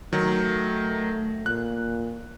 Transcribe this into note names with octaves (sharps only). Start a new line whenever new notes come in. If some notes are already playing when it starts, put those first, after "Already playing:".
D#3 F#3 A3
A#2 F#6